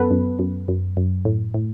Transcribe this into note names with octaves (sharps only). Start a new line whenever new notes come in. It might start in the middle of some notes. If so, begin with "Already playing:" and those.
Already playing: F#2 B3 A4 B4
F#2
F#2
F#2
F#2
A2
A2